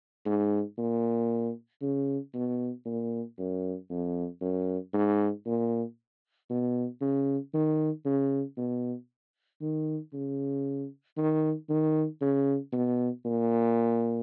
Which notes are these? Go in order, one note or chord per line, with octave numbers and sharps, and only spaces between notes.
G#2
A#2
C#3
B2
A#2
F#2
F2
F#2
G#2
A#2
B2
C#3
D#3
C#3
B2
D#3
C#3
D#3
D#3
C#3
B2
A#2